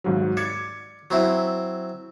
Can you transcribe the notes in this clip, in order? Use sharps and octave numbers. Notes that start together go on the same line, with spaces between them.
G#1 G#2 F#3
D5 G#6 C#7
F#3 C4 E4